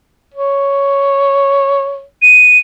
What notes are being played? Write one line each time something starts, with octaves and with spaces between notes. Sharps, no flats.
C#5
D#7